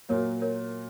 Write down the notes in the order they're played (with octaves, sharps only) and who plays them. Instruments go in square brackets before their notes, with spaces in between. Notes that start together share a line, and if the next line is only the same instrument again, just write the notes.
[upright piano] A#2 F#3 A#3 [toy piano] A#4 C#5
[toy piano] A#4 C#5